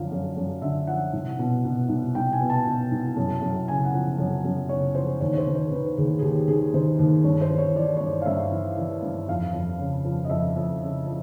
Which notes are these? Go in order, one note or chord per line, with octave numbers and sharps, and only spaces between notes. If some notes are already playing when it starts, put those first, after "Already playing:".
Already playing: F#2 D3 F3 F5
F#2
F#2
D3 E5
F3 F#5
C2
B2
B2
C2
C2 G5
G#5
B2
A5
B2
C2
F#2
F#2
C#3 G#5
F#5
F3
F#2
F#2
C#3 C#5
F3 C5
D#2 C#5
C#5
C5
D#3
C5
D#3 B4
D#2 G#4
G#4
D#2 G4
D#3 G#4
D#3 C5
D#2
G2 C#5
C5
E3
C#5
E3 D5
C#5
G2 D5
F5
G2 E5
E3
E3
G2
F2 F5
F2
C#3
F3
D#5
F2 E5
F2
C#3
F3